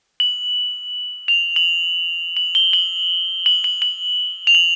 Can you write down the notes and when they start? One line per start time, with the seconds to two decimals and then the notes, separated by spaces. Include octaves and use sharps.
0.20 F#7
1.28 F7
1.56 F#7
2.37 F#7
2.55 G7
2.73 F#7
3.46 F#7
3.64 F#7
3.82 F#7
4.47 F7
4.55 F#7